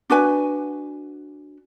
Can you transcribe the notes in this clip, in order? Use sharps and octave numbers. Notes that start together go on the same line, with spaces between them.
D4 F#4 B4 G#5